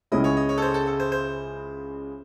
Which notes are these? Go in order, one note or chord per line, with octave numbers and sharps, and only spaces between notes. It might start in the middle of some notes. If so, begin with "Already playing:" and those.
C#2 C#3 G#3 C#4 E4 D#5
C#5
D#5
C#5
A4
C5
A4
A4
C5
C5